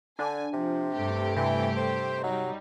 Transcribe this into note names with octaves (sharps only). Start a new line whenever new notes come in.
D3 D4 G#5
C3 F3
G2 A3 G4
C3 E3
C5
F#3 G3 D#4